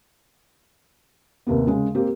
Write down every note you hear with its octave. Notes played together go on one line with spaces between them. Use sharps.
D#2 C3 A#3 B3
C#3 G#3
A#3 C4 G4